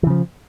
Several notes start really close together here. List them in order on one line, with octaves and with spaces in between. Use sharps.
E3 C#3 F3